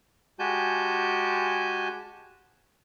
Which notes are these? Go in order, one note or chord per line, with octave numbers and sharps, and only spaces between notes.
G#3 F#4 G4 G#5 A5 G6